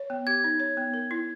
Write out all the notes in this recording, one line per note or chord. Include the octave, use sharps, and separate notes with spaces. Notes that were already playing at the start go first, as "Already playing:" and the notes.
Already playing: C#5
B3
G4 G#6
D#4
C#5
B3
A#4
E4